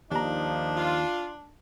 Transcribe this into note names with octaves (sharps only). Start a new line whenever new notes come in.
D#2 F3 A#3 D4 D#4 A#5
F4